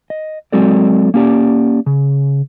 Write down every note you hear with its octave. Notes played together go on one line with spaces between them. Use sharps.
D#5
F#3 G#3 C4 F#4 A4 D5
A#3 C#4 G4 D5
C#3